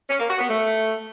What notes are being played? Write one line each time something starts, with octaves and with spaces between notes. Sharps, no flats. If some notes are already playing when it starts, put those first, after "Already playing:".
C#4
A#3
F#4
B3
A3